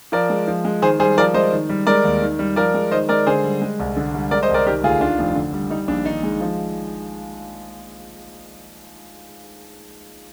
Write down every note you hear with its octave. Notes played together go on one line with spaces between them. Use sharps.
F3 A#4 D5
G#3
F3
G#3
D#3 G#4 C5
G3 G#4 C5
F3 A#4 D5
G#3 C5 D#5
D#3
G3
G#3 A#4 D5
D#2
D#3
G3
F3 A#4 D5
G#3
D#3 C5 D#5
G#3 A#4 D5
D3 G#4 C5
G3
G#3
C2
D3
G3
G#3 A#4 D5
C5 D#5
C2
A#4 D5
D#3 G4 A#4
D2 F4 G#4
D#3 D4 F4
F1
D3
G3
G3 D#4
A#1 D4
D#3 D#4
G#3
F3